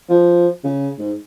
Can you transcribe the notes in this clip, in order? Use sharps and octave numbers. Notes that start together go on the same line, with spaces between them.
F3
C#3
G#2